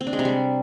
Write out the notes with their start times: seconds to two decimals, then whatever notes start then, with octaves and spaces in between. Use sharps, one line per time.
0.01 C4
0.07 D4
0.13 G#3
0.19 C3
0.25 G3